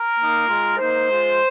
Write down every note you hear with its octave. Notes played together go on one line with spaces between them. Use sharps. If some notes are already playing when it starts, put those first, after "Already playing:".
Already playing: A#4
A#3 D#4
G#3 F4
A#3 D#4 C5
G#3 F4